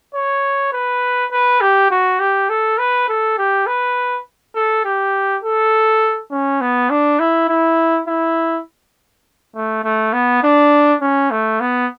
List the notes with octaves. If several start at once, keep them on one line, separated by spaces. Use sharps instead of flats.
C#5
B4
B4
G4
F#4
G4
A4
B4
A4
G4
B4
A4
G4
A4
C#4
B3
D4
E4
E4
E4
A3
A3
B3
D4
C#4
A3
B3